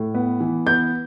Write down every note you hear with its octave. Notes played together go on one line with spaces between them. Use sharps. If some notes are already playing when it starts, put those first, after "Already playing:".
Already playing: A2
B3
E3
B3 G6